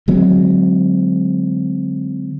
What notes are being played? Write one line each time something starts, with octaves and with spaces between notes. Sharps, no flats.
D3 F#3 G#3 C4